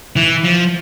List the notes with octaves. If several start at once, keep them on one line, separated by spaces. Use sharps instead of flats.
E3
F3